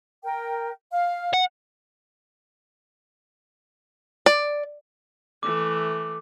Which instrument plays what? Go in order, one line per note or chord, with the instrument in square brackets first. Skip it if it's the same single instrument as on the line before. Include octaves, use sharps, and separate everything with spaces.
[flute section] A#4 G5
F5
[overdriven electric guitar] F#5
[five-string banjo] D5
[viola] E3 A3 [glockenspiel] D6